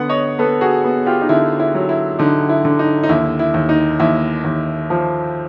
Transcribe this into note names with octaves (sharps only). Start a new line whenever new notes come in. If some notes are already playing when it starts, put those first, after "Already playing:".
Already playing: D3 B3 F#5
C#5 D#5
B3 A4 B4
F#4 G#4
B3
F4 G4
D#4
D3 E4
E4
F#3
E4
D3 D#4
E4
D3
D#4
D#4
D#2 E4
E4
D#2
D#4
D#2 E4
D#2
F3